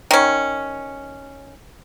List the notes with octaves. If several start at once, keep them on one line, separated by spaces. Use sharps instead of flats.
D#3 C#4